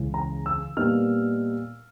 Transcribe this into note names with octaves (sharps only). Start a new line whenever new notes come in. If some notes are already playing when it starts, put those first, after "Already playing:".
Already playing: C#2 C#3 E3 G#3
A#5
E6
A#2 G3 B3 D#4 F6